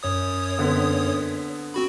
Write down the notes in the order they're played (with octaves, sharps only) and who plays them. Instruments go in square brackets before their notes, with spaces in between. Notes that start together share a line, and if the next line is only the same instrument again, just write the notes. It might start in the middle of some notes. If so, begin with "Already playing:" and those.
[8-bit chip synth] F#2 C#5 D#6
[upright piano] D3 B3 C4
[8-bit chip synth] C4 F#4 B5